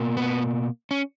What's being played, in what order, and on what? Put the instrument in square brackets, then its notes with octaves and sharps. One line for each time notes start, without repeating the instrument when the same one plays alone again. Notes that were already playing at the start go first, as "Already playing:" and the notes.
Already playing: [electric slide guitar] B2 A#3
B3
C#4